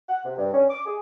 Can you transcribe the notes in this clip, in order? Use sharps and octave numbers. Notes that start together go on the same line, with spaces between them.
F#5
C3
G2
C#4
D6
G#4